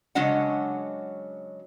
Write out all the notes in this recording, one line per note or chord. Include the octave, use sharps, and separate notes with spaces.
C#3 F#3 G#3 D4 D#5 F#5